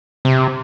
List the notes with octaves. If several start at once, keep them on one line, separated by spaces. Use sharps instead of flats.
C3